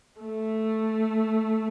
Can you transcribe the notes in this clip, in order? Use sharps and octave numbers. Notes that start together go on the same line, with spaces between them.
A3